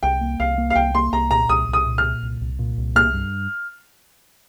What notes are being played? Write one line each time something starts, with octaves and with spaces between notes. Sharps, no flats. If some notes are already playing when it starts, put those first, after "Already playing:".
C2 G5
A#3
C2 F5
A#3
F5
C2 G5
A#3 C6
C2 A#5
A#2 A#5
C2 D#6
C2
D#6
A#2
F6
A#2
C2
C2
A#2
C2
A#3 F6
G2